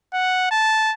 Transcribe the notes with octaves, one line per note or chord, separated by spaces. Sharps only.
F#5
A5